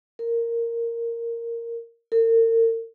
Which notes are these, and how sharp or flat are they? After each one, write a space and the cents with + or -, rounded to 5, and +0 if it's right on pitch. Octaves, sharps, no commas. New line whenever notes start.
A#4 -5
A#4 -40